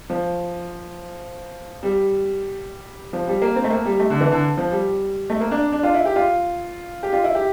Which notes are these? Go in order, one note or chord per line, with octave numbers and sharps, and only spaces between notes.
F3
G3
F3
G3
A#3
C4
A3
A#3
G3
A3
D3
E3
D3
F3
G3
A3
A#3
D4
D4
F4
E4
G4
F4
G4
F4
E4
G4